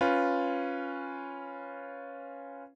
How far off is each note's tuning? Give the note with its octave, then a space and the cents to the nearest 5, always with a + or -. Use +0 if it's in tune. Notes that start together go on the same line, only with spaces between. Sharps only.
C#4 -5 F4 +0 B4 +0